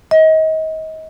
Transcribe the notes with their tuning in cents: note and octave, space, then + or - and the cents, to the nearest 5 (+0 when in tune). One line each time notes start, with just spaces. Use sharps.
D#5 +30